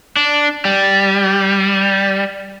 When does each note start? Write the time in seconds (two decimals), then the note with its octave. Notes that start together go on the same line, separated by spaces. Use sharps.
0.16 D4
0.65 G3